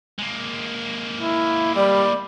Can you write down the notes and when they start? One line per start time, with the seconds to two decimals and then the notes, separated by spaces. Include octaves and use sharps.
0.19 G#3 A#3
1.21 E4
1.75 G3 D5 B5